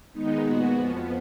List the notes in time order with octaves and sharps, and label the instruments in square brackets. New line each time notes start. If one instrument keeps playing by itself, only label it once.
[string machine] D#3 G#3 B3 D#4
A#2 G#3 B3 F#4
F2 F3 B3